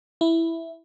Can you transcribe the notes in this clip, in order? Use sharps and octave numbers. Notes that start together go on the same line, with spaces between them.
E4